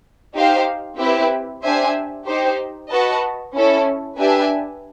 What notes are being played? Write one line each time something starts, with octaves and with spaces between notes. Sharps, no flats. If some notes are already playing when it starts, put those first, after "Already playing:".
D#4 G4 C5 F5
C4 E4 G4 B4 E5
D4 G4 C5 E5 G#5
D#4 G4 C5
F#4 B4 D#5 F#5 A5
C#4 E4 A4
D4 G4 B4 E5 G#5